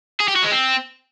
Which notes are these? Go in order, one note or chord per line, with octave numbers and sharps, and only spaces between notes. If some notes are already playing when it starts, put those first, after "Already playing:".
G#4
G4
F#4
G#3
C4